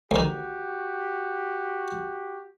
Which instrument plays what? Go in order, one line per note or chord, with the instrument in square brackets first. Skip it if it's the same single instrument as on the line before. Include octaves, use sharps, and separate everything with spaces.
[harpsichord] D2 D#3 [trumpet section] F#4 G4